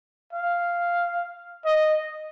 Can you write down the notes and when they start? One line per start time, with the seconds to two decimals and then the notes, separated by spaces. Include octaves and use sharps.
0.33 F5
1.65 D#5